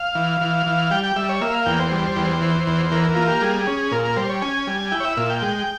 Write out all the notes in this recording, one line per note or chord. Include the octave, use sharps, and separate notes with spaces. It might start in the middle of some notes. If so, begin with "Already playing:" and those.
Already playing: F5
E3
E3
E3
G3 G5
G5
G3 E5
C#5
A#3 E5
F5
E2 G5
C5
G3
E2
E3
E2
E3 A#4
A#3 F4
G4
G3 G#4
C#4
A#2 A#4
A#4
G3 C5
C#5
C#4 G#5
G3
E4 G5
C#5
E5
A#2 E5
G5
G#3